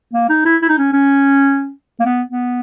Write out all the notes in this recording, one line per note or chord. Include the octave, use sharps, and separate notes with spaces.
A#3
D#4
E4
E4
D#4
C#4
C#4
A#3
B3
B3